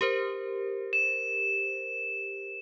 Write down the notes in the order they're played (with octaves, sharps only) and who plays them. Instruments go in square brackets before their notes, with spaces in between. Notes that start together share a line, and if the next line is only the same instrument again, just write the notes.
[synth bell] G4 A#4 C5
[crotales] E7